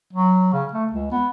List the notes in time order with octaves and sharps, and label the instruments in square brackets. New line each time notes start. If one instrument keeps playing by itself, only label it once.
[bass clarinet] F#3
C#3
A3
C#2
B3